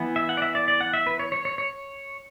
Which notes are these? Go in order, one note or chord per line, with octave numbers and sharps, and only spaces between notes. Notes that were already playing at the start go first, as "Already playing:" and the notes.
Already playing: E3 B3
E5
F#5
D5
E5
D5
D5
F#5
E5
B4
C#5
C#5
C#5
C#5